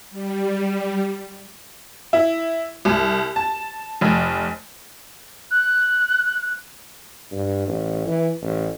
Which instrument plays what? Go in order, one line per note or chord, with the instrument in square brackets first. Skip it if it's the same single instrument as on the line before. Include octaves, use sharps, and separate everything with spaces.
[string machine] G3
[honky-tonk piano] E4
C2
A5
F1
[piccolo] F#6
[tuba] G2
A1
E3
A1